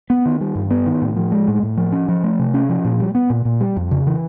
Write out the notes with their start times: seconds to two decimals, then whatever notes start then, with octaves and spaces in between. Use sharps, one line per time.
0.10 B3
0.26 D#3
0.41 G3
0.55 G2
0.71 B3
0.86 D#3
1.02 A2
1.16 F3
1.32 G#3
1.48 A2
1.63 A2
1.77 F3
1.92 C#4
2.09 F3
2.24 A3
2.39 C3
2.54 C#4
2.69 F3
2.85 A#2
3.00 G3
3.15 B3
3.30 A#2
3.45 A#2
3.61 G3
3.77 F2
3.91 C#3
4.07 E3